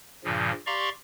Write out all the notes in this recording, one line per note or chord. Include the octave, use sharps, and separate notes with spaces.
G2 A#2 C#3 F3
G4 D5 F5 A#5 C6 C#6